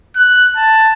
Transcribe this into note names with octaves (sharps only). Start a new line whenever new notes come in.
F#6
A5